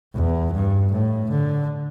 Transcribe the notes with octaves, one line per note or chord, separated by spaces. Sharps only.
E2
G2
A2
D3